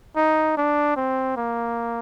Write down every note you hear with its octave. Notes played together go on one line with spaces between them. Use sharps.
D#4
D4
C4
A#3